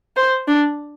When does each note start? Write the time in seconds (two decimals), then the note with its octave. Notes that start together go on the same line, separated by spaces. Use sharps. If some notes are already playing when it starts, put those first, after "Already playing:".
0.16 C5
0.48 D4